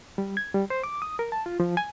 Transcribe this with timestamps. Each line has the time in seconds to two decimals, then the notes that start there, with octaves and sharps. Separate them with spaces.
0.18 G3
0.37 G#6
0.54 G3
0.70 C5
0.84 D6
1.02 D#6
1.19 A#4
1.32 A5
1.46 F4
1.60 F3
1.77 G#5